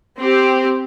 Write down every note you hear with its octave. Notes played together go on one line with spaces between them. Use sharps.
C4 G4 C5